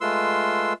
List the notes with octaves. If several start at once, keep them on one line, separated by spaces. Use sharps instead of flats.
G#3 A3 F4 B4 C6 E6